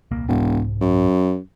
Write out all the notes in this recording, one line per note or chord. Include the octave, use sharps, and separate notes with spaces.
D#1 C2 A#3
E1 C2 G#2
F#2